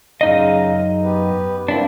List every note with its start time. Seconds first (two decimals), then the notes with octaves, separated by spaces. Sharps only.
0.21 F#2 C#3 D#4 D#5 F5
1.04 B3 G4 B4
1.68 G2 A#3 C4 D4 E4